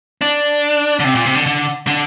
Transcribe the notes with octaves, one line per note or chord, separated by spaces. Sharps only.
D4
D3
C3
A#2
C3
D3
D3
D3